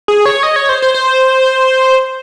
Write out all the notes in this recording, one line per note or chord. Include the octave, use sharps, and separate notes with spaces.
G#4
C#5
D#5
C#5
C5
C5
C5